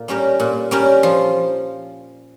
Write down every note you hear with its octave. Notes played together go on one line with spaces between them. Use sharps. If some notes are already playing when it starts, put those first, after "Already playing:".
Already playing: A#2
G3 C#4 G4 A#4
A#2
G3 C#4 G4 A#4
F3